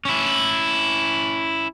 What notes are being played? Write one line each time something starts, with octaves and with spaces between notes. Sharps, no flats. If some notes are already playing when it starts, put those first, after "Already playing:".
C#4 E4